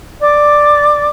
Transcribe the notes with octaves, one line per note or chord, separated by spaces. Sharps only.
D5 D6